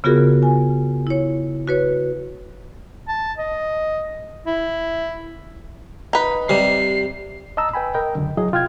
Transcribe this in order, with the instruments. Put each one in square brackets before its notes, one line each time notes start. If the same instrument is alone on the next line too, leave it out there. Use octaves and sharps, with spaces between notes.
[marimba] C#3 B3 F4 F#4 G#4 A#4
G#5
E4 C#5
F#4 B4 C#5
[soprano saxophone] A5
D#5
E4
[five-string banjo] D#4 B4
[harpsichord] C3 G3 [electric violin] C7
[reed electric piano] D#5 A5 A#5 E6
B4 G5 G#5 B5
A#4 D#5 G5
C#2 F#2 D3
F#3 E4 G#4 D#5
C3 F4 G5 F6 G#6